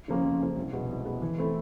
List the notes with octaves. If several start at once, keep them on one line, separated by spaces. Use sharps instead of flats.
C#3 F3 A#3 C#4
F2
C#3 F3 A#3 C#4
C2
B2 G#3 B3
C2
B2 G#3 B3
E3
A3 C4 E4 A4